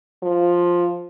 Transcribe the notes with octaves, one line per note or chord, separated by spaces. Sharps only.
F3